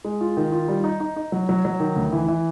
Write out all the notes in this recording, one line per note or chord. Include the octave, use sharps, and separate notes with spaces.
G#3
F4
D#3
F4
G3
D#4
D#4
D#4
F#3
F#3
F#3
D#3
D2
E3
E3